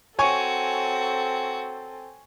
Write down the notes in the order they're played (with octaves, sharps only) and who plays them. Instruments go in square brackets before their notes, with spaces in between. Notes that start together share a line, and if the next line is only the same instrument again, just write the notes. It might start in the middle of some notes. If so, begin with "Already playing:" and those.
[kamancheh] C4 A4 [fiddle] F#4 [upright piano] C#5 G#5 C#6